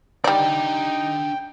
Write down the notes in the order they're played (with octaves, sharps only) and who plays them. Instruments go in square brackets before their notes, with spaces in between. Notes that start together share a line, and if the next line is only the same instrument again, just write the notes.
[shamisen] G3 D5 [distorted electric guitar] D4 F#5 [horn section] D#4 [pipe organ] G5